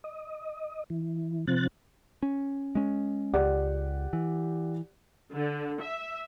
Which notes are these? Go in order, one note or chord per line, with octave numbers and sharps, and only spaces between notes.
D#5
E3
C3 F3 C4 F#6 A6
C#4
G#3 C#4
C#2 G4 D5 F#5
E3
D3
E5